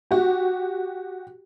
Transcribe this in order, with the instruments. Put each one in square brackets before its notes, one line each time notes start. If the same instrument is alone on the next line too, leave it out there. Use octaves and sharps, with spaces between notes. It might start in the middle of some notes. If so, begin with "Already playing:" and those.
[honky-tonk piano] F#4 G4